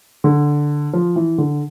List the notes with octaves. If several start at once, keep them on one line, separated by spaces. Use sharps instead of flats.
D3
F3
E3
D3